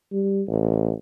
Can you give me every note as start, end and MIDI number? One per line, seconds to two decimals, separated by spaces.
0.12 0.42 55
0.48 0.93 33